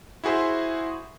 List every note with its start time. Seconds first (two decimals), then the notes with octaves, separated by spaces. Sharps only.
0.24 E4 F#4 G#4 C5 E5